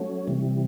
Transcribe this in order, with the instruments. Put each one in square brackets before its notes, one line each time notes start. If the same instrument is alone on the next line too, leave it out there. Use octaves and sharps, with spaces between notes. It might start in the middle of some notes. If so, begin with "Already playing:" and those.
Already playing: [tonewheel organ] F#3 A3 C#4
C3 E3 G3